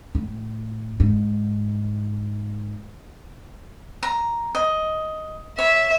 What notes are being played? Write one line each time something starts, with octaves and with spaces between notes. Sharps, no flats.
A2
G#2
A#5
D#5
C#5 E5